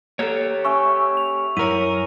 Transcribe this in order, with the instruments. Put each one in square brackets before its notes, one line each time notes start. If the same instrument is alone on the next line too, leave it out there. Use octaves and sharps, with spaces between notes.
[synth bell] A#3 A4 [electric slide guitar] G4 C#5
[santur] C#4 E5 [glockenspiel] C#6
[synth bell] F7
[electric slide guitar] F#2 A#4 [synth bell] E4 C#5 [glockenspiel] D#7